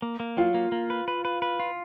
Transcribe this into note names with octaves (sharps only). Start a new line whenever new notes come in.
A#3
A#3
F#3 F4
A#3
A#3
B4
B4
B4
B4
F4